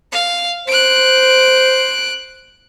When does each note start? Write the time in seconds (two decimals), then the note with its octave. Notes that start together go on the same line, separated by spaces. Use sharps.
0.12 F5
0.68 C5 F#6 D7